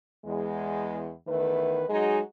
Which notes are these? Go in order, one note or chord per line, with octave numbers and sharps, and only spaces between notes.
E2 G#3
E2 D#3 A3 B4
F#3 G#3 D#4 F#4 G#4